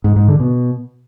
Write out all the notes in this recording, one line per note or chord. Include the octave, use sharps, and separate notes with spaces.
G#2
G#2
D3
B2